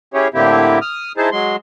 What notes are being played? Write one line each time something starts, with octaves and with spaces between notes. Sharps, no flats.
C#4 E4 G4 G#4 C#5
A2 D3 A#3 C4 E4 G4
D#6 F6
D#4 E4 G#4 C5 A5
F#3 G#3 C6